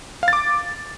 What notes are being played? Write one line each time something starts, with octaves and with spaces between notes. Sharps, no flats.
F5
A6
D6